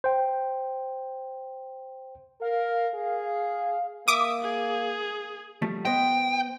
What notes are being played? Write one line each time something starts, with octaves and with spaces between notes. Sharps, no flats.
C5 G5
A#4 F5
G#4
A#3 E5 D6 D#6
G#4
F3 G3 A3
B3 C5 D#5 G5